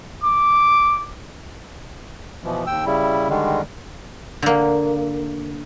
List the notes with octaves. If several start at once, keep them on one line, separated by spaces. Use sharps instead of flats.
D6
B2 E3 F3
D#2 G5 E6
C#3 G3 E4
D3 D#3 G3 G#3
D3 A#3